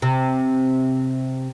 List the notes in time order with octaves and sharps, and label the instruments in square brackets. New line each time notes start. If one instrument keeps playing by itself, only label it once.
[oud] C3